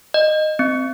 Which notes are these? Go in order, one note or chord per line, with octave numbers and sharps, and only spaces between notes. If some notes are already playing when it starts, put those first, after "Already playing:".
D#5
C4